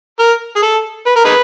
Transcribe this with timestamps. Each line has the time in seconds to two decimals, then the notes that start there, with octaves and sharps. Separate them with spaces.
0.19 A#4
0.56 G#4
0.63 A4
1.06 B4
1.16 A#4
1.25 D#4 G#4 B4